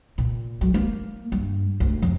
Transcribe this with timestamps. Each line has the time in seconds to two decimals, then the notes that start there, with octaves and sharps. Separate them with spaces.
0.18 A#2
0.61 F#3
0.74 A#3
1.32 G2
1.80 D2
2.02 F2